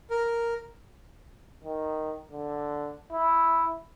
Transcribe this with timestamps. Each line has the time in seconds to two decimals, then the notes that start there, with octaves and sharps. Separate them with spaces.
0.11 A#4
1.64 D#3
2.31 D3
3.12 E4